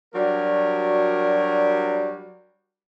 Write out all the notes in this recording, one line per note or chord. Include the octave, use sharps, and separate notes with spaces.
F#3 G3 D4 F#4 A#4